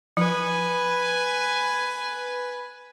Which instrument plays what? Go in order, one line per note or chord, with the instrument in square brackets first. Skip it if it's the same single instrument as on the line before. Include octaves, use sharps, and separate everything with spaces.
[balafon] F3 [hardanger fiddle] B4 G#5